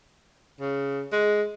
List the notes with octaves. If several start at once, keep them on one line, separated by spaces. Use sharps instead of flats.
C#3
G#3